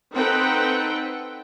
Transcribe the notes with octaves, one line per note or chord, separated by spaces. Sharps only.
C4 D#4 A4 B4 F#5 G5